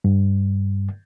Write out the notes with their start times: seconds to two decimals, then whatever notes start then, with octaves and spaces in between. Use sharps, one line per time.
0.04 G2